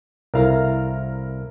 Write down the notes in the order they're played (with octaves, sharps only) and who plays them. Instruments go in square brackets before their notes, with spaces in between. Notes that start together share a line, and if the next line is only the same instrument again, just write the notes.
[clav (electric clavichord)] C2 F5 A#5 [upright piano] E4 A4 A#4